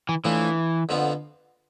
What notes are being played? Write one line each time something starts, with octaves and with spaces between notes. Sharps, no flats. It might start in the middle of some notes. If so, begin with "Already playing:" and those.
E3
A2 E3 F3 A3 D4
F2 D3 F3 B3 F4